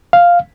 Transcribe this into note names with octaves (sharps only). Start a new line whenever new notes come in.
F5